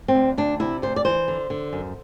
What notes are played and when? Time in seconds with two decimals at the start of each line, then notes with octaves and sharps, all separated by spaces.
0.08 C4
0.15 D2
0.37 D2 D4
0.60 C3 E4
0.82 D2 C5
0.96 D5
1.05 E3 C5
1.28 D3
1.50 D3
1.73 F#2